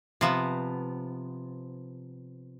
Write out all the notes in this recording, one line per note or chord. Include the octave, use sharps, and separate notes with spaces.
C3 F3 B3